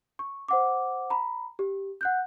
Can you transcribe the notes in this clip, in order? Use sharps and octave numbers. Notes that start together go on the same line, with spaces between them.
C#6
C5 F#5 D6
A#5 B5
G4
F#5 F#6 G6